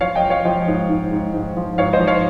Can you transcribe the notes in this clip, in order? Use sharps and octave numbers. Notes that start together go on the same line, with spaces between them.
F3 C#5 F5
D#5 G5
F3
C#5 F5
F3 D#5 G5
G#2
G#2
G#2
G#2
F3
G#2 C#5 F5
C5 D#5
F3
C#5 F5